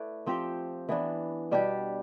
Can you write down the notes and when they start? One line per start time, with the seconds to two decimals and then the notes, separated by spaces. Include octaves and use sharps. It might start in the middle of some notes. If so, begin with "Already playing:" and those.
Already playing: A3 E4 B4 D5
0.26 F3 C4 G4
0.89 E3 B3 D4
1.51 B2 G3 D4 G4